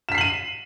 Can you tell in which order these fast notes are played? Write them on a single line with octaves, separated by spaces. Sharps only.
E7 B6 C7 F#7 D#7